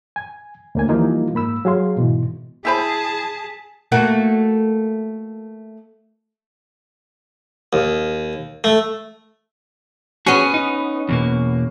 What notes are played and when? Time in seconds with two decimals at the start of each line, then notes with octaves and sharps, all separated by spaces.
0.16 G#5
0.75 D2 A#3 G#5
0.89 E3 F3 G3 A#3 D#4 F4
1.34 G#2 A#3 B5 E6
1.65 F#3 G#4 F5 C6
1.97 G#2 B2 E3
2.65 E4 G#4 C5 G#5 A5 B5 B6
3.92 A3 A#3 F#4
7.73 D#2
8.64 A3
10.26 B3 C#4 F#4 G#4
10.54 D#4
11.09 E2 B2 A#3